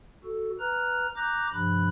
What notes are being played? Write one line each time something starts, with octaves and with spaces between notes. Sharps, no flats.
F#4 A4
B4 A#5 F6 F#6
A#5 D6 F#6 G6 A#6
G2 C3 F3 B5 F#6